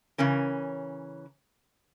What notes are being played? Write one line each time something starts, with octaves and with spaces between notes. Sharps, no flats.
C#3 E3 C#4 A#4